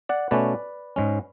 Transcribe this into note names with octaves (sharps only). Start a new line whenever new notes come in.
D5 F#5
B2 A3 C#4 B4 D5
G#2 G#3 C#4